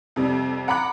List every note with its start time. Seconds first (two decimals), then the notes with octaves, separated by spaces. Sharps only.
0.16 F2 C3 G3
0.68 F#5 A#5 B5 D6 F#6